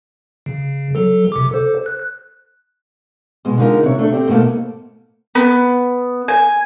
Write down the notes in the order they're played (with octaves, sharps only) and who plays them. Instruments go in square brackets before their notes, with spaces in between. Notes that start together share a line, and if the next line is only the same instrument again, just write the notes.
[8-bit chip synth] C#3
F#3 A4
C3 D6
A4 C5
F#6
[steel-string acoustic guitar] B2 G#3
D3 G#3 D#4 F4 A#4
C3 C#5
A3 D4
C4 G4
G#2 B2 D#3 A3 A#3
[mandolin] B3
G#5